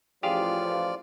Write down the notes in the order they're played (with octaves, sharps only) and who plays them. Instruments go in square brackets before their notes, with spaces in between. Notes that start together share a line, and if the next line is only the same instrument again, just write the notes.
[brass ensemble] A1 F3 [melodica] F4 D5 [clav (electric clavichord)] G4 G#4 F5